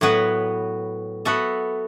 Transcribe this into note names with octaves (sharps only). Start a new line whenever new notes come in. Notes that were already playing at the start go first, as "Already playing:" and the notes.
A2 F#3 B3 F#4 B4
B3 F#4 A4 E5